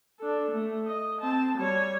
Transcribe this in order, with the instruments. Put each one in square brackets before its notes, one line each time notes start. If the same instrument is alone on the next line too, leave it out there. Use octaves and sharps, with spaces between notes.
[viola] D4 A4
A3
D#5
C4 A5
G3 C#5